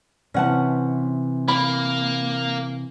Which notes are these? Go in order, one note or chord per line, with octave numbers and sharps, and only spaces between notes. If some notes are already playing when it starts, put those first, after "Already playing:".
C3 E3 C#4 E4 F#5 A5
A#3 B5